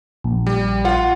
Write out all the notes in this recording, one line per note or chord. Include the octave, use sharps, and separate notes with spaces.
A#1
G3
F4 F#5